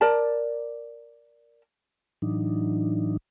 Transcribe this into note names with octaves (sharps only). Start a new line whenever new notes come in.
A#4 D5 A5
A2 E3 F#3 D4 D#4